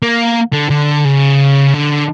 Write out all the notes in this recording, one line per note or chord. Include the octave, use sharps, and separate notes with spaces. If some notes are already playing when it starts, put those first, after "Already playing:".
A#3
D3
D3
C#3
D3